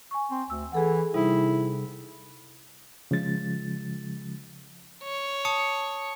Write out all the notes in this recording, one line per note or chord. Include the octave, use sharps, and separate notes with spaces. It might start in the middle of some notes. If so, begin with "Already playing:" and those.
G#5 C#6
C4
D2 E6
E3 G#4 A4 F#5
C3 G3 D#4 E4
C#3 F3 G#3 A6
C#5
A5 D#6 C#7